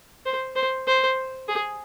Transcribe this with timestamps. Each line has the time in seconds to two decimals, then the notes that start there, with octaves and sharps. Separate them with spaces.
0.26 C5
0.56 C5
0.87 C5
1.48 G#4